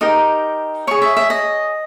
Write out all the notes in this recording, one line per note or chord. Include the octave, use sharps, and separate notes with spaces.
D#4 G4 A#4 D#6
G#4 C#5 C#6
E5
E5
D#5